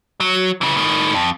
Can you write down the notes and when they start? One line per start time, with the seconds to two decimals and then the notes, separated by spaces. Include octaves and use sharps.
0.20 F#3
0.61 C#3 E3
0.77 A2 D#3
1.14 F2